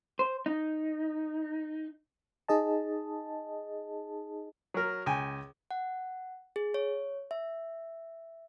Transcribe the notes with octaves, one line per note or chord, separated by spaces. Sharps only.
C5
D#4
D#4 G#4 D#5 A5
F#3 A#4
C#2 G5 G#5
F#5
G#4
C#5
E5